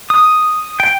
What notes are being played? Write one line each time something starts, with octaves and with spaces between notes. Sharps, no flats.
D#6
G5